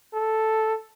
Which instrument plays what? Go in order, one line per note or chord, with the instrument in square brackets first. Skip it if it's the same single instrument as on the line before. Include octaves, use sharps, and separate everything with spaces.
[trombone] A4